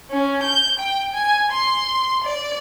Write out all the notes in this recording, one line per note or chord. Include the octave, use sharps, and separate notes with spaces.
C#4
G6
G5
G#5
C6
D5